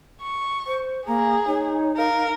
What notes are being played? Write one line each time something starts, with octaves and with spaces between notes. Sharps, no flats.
C#6
C5
A#3 G#4 A#5
D#4 C#5
A#4 F5